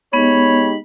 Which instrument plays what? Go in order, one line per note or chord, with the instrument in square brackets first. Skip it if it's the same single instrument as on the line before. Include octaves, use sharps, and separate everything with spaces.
[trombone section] G#3 D#4 G4 [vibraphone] B3 [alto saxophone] C#5 [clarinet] B5